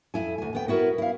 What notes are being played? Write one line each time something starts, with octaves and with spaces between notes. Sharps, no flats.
F2 E4 G#5
D2 G#5
D2 B3 G5
B3 E4 F#4 A#4
E4 F5